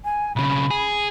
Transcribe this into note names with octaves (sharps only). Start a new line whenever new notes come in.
G#5
B1 C#3 B5
G#4